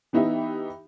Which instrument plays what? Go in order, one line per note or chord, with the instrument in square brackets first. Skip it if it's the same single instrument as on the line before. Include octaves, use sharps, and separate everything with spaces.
[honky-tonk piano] E3 B3 D#4 G4 E5